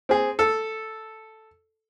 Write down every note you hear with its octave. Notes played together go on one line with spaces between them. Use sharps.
C4 G#4
A4